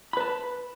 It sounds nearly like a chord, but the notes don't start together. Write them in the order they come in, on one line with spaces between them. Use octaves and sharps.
B5 B4 A5